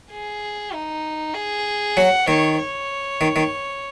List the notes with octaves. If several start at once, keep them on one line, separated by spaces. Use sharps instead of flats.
G#4
D#4
G#4
F#3 F#5
D#3 C#5
C#5
D#3
D#3